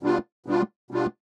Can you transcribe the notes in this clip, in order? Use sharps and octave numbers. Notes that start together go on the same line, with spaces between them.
B2 G3 D4 F4
B2 G3 D4 F4
B2 G3 D4 F4